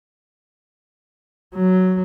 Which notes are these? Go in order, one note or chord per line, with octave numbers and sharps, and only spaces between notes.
F#3